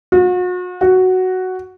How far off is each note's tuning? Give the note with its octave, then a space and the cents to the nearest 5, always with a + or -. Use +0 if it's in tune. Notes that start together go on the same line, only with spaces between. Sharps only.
F#4 -40
F#4 +5